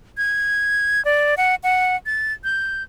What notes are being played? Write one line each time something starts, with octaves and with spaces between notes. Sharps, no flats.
G#6
D5
F#5
F#5
A6
G6